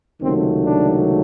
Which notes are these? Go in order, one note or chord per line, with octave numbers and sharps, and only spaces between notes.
C#2 C3 D#3 F#3 A3 C4
D4